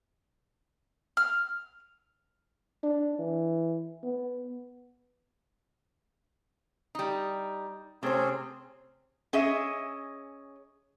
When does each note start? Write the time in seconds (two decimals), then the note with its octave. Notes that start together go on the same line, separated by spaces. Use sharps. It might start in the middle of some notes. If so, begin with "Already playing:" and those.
1.17 F6
2.83 D4
3.19 E3
4.03 B3
6.95 G3 D#4
8.03 C3 A3 C4 C#4 G#4 C5
9.33 C#4 G#4 D#5 E5